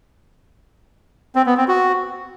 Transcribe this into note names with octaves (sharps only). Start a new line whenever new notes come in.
C4
B3
C4
F#4